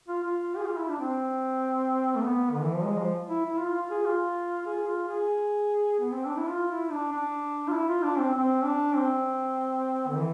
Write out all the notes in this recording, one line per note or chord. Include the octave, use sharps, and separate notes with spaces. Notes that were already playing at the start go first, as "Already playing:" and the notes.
F4
F4
G#4
F4
E4
D4
C4
A3
B3
D3
E3
F3
G#3
F3
E4
E4
F4
F4
G#4
F4
G#4
F4
G#4
B3
C4
D4
E4
F4
E4
D4
D4
F4
E4
F4
D4
C4
C4
D4
C4
D3
E3